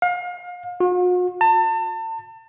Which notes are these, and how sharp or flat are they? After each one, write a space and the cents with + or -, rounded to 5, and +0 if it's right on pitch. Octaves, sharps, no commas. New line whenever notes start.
F5 +35
F#4 -45
A5 +35